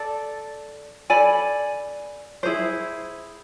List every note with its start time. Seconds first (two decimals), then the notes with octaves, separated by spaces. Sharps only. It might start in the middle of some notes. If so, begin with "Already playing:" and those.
Already playing: A4 D5
1.10 A4 D5 G#5 B5
2.43 E4 G#4 C5